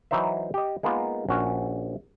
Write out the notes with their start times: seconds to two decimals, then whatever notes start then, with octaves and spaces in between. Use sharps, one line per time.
0.11 E3 F#3 D#4 C5 E5
0.54 G4 D#5
0.83 G#3 A#3 B3 D#4 F4 A#4
1.29 A#1 C#4 F#4